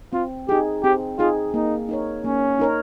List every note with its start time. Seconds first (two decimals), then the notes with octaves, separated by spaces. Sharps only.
0.13 C4 F4
0.48 D#4 G4 G#4
0.83 C4 G4
1.18 D#4 F4 G#4
1.54 A#3 D#4
1.89 D#4 A#4 C#5
2.24 A#3 C#4
2.59 D#4 A#4 C#5